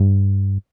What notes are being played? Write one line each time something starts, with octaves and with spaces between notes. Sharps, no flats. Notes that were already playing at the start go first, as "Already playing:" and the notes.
Already playing: G2